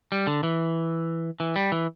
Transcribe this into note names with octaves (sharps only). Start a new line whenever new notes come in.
G3
D3
E3
E3
G3
E3